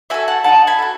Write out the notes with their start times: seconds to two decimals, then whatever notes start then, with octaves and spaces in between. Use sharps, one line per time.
0.10 F#4 A4 E5 G#5
0.28 F#5 A5
0.44 D#4 F#5 A5
0.67 G#5 B5
0.78 F#4 A4